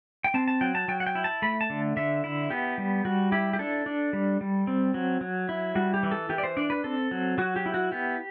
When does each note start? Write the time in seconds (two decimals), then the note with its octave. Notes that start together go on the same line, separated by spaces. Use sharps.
0.24 G5
0.34 C4 A5
0.48 A5
0.61 F#3 G5
0.75 A5
0.88 F#3 G5
1.00 F#5
1.07 G5
1.15 E4
1.24 A5
1.42 A3 B5
1.61 A5
1.70 D3
1.97 D3 E5
2.24 E4
2.50 B3 G4
2.78 G3
3.05 G3 F#4
3.32 E4 G4
3.53 G4
3.59 D4 A4
3.86 D4
4.13 G3
4.41 G3
4.67 C4
4.94 F#3
5.21 F#3
5.49 E4
5.75 G3 F#4
5.94 G4
6.03 E3
6.11 A4
6.29 E3 G4
6.38 D5
6.44 C5
6.57 D4 D5
6.70 B4
6.84 C4 A4
7.11 F#3
7.38 F#3 F#4
7.56 G4
7.66 E4
7.74 F#4
7.92 B3 G4